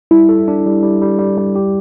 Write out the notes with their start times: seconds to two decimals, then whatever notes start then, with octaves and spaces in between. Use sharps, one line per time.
0.11 G3 E4
0.29 A4
0.48 D4
0.66 G3
0.83 G3
1.02 G3
1.19 G3
1.38 G3
1.56 G4